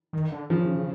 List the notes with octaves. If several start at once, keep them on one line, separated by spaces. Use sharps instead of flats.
D#3
D3
C#3 F3